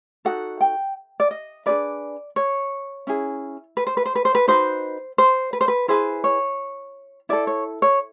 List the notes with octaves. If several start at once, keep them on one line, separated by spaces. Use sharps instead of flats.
D#4 F#4 A4 F#5
G5
D5
D#5
D4 F4 G#4 B4 D5
C#5
C#4 E4 G#4
B4
C5
B4
C5
B4
C5
B4
D#4 F#4 B4 C5
C5
B4
C5
B4
E4 G#4 B4 C5
C#5
E4 A4 D5
C#5
C#5